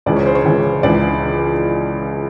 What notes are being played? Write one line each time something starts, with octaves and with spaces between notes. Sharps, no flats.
C#2 C#3 E3 D5
C#5
C5
C#5
C#2 C#3 E3
C#2 C#3 E3 D5